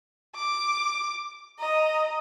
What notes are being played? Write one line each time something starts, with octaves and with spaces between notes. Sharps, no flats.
D6
D#5 A#5